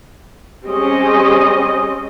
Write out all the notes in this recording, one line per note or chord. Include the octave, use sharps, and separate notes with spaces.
G3 C4 C#4 G4 G#4 D#5